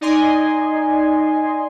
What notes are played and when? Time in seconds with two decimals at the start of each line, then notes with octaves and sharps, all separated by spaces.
0.01 D#4 D5 D#5 G#5 C6